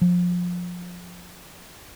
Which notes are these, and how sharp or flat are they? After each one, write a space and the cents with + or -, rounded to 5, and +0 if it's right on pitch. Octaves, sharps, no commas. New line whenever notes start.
F3 +25